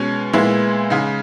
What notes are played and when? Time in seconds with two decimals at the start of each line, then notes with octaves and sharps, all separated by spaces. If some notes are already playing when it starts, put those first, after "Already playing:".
Already playing: B2 G#3 C#4
0.33 A#2 G#3 B3 E4
0.90 C#3 G#3 D#4